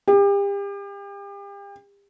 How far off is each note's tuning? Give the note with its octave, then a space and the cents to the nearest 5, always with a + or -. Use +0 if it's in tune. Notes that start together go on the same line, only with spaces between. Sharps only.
G4 +35